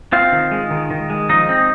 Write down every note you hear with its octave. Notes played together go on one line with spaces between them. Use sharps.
C4 F4 F5
D#3
G#3
D#3
D#3
G#3
F3 D#4 D#5
C4